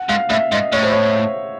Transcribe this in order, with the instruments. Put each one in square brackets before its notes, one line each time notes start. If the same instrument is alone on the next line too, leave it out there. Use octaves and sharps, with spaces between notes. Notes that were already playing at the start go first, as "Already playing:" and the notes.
Already playing: [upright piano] F#5
[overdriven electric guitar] G#2 [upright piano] F5
[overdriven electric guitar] A2 [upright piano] E5
[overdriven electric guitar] G#2 [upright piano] D#5
[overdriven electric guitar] A2 [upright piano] C#5
[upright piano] C5
C#5